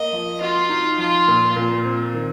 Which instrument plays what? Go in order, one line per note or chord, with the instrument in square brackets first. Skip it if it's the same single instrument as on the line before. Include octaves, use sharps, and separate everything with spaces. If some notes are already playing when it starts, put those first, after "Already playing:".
Already playing: [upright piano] A#3 [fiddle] D#5
[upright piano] F3
[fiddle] F4 [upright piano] F#4
[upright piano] D#4
[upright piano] F3 [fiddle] F4
[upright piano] A#2
A#2
C4
D#3